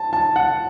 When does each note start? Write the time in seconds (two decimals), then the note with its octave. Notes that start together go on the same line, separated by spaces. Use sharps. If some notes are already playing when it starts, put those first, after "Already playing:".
Already playing: A5
0.13 A5
0.36 F#5